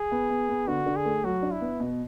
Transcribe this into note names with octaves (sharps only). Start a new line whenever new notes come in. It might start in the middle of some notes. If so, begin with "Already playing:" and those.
Already playing: G#4
B3
B3
B3
D3 F#4
D3
G#4
A3
F#3 F#4
D4
E4
B3
B2